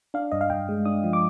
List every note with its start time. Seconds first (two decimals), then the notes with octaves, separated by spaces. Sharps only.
0.14 D4 F5
0.32 G2 D#5
0.41 F5
0.50 G2 G5
0.69 G#3
0.85 D4 D#6
1.04 F3
1.13 D6